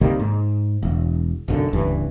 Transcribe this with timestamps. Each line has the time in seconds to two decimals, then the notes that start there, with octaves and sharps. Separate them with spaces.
0.01 C3 D#3 G3 A#3
0.20 G#2
0.83 E1
1.48 B1 F#2 D3
1.73 D1 C#2 G2 E3